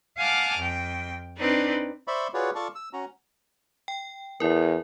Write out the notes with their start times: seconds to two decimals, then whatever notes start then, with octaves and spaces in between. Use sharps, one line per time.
0.17 F5 F#5 G#5 A5 D6 F6
0.59 F2 G5
1.36 C4 D4 D#4 B4 D5
2.08 C5 D5 E5 B5 C#6
2.34 F4 F#4 G#4 B4 C#5 D5
2.55 F4 A4 D5 A5 C#6
2.75 E6
2.93 C#4 F#4 A#5
3.88 G5
4.40 E2 E4 A#4